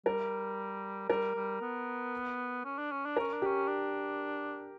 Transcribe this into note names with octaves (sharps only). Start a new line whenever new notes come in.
G3 A#4
G3 A#4
G3
B3
C#4
D4
C#4
D4
A#4
C#4
D4
C#4 G4
D4